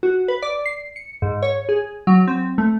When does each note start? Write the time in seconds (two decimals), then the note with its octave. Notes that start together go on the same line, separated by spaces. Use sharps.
0.03 F#4
0.28 B4
0.42 D5
0.66 C7
0.96 C#7
1.22 G#2
1.43 C#5
1.69 G#4
2.07 F#3
2.27 C4
2.58 A3